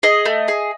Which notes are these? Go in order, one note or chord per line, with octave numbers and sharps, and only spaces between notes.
G#4 D#5
A3
G#4